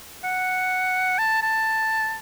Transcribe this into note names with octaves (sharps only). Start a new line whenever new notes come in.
F#5
A5
A5